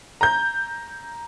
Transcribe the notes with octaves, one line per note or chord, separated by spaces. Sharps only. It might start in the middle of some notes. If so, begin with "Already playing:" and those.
A#5 G6